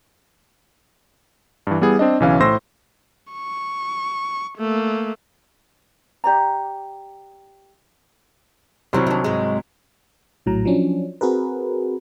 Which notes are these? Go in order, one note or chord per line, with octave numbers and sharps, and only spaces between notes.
G2 E3
G3 B3 E4 G#4
C4 D4 D#5
B1 C#3 E3 C#4 F5
A2 C5 C6 E6 A#6
C#6
A3 A#3
G4 D5 A#5
C2 F#3 G3 C4 E4
D#3 D4
G#2 G#3
A#1 A2 F#3 A#5
F3 F#3 C#4 D4
C4 F#4 G#4 A#4 B4